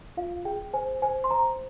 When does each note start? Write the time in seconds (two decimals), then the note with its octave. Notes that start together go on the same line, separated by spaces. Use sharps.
0.17 F4 F5
0.45 G#4 G5
0.74 C5 G#5
1.02 C5 G#5
1.24 C6
1.31 C5 A#5